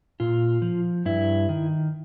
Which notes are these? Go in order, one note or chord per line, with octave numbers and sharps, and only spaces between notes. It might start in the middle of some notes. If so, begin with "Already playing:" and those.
A#2 F4
F3
G2 E4
D#3